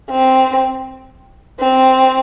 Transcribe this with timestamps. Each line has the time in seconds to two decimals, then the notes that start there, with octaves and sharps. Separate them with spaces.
0.11 C4
1.60 C4